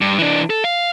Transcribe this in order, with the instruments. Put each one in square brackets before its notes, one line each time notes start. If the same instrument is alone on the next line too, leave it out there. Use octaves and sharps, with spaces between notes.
[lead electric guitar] G2
E3 D4
A4
F5